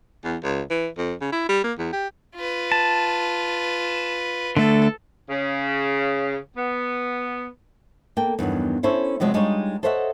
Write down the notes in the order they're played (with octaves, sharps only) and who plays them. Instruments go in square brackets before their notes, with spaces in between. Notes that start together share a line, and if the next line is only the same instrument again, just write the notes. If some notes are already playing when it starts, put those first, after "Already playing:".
[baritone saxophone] E2
C#2
E3
F2
C#3
E4
G3
A#3
E2
G4
[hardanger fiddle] F4 B4
[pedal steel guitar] A5
[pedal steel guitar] D3 A3 [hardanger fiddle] A4
[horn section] C#3
B3
[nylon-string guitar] A#3 A4 G5
E2 G2 D#3 F#3
C#4 E4 A4 C5 C#5
C3 F3 F#3 G#3 D4
G3 G#3 D4 D#4 F4 C#5
A4 C5 C#5 D#5 E5 F#5